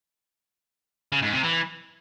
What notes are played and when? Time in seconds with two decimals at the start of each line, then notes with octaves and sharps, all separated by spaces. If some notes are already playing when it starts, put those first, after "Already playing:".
1.12 C#3
1.22 G#2
1.33 C3
1.43 E3